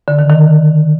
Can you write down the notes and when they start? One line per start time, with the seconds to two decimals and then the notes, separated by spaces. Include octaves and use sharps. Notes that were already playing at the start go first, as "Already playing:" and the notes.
0.08 D3
0.19 D#3
0.30 D#3